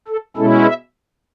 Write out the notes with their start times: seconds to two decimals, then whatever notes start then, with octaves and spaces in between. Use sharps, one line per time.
0.08 A4
0.37 B2 G#3 C#4 E4 A4
0.65 E5